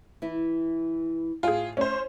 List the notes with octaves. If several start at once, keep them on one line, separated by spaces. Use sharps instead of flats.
E3 E4
A2 F4 G#4 G5 G#5
A3 C#4 C5